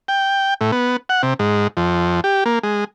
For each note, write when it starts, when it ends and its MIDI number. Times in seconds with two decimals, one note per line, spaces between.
0.08 0.54 79
0.61 0.71 45
0.72 0.97 59
1.09 1.22 78
1.23 1.34 48
1.39 1.68 44
1.77 2.20 41
2.24 2.44 67
2.46 2.59 58
2.63 2.84 56